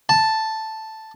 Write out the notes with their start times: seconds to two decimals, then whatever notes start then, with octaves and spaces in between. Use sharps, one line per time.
0.09 A5